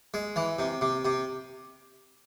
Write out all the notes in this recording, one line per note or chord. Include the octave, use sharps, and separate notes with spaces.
G#3
E3
C3
C3
C3